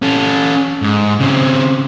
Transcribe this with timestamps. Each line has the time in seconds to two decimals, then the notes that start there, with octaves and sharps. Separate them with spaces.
0.02 C#4 A4
0.82 G#2
1.20 C#3 C4